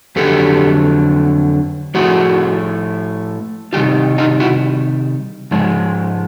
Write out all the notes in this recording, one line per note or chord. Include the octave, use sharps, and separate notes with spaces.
F2 D3 F#3 G4 A4
A2 F3 A3 F#4 G#4
C3 D#3 G3 F4 G4
D#4 F4
E4 F#4
G#2 F3 G#3